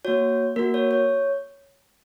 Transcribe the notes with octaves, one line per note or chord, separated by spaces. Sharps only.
A#3 F#4 C#5
A#3 F#4 A#4
C#5
C#5